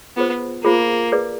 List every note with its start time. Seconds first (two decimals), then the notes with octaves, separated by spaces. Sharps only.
0.17 B3 F4 G#4 C5
0.64 A#3 F4 G#4 C5
1.12 G#4 B4 D5